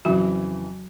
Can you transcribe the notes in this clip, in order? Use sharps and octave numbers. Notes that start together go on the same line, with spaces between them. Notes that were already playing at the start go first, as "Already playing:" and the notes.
F2 C#3 E3 F#3 F#4